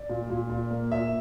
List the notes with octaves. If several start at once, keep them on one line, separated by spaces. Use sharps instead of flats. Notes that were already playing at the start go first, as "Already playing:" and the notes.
Already playing: D5
A#2
A#2
A#2
A#3
A#2 E5